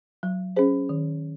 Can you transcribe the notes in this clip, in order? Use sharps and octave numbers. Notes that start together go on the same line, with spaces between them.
F#3
C#4 G#4 C5
D#3